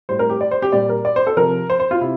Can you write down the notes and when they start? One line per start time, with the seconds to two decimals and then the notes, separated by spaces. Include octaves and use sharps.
0.09 A2 G3 C5
0.19 A#4
0.30 G4
0.41 D5
0.51 C5
0.62 G4
0.73 A#2 G3 D5
0.89 A#4
1.05 D5
1.16 C5
1.27 A4
1.37 C3 F3 A#4
1.70 C5
1.80 C5
1.91 F4
2.01 C3 E4